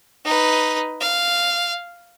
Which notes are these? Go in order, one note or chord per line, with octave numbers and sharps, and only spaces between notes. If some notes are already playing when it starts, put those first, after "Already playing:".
D#4 B4
F5